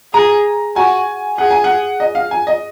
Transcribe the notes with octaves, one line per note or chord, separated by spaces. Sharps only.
G#4 A#5
F#4 G#5
G#4 F#5
G#5
F#5
D#5
F5
G#5
D#5